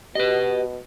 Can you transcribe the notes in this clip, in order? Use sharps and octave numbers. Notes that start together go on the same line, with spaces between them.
B2 G4 B4 D#5